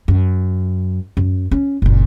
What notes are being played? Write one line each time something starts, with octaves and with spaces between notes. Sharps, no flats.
F#2
F#2
C#4
F#1 A#2